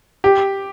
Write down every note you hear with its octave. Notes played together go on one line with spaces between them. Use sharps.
G4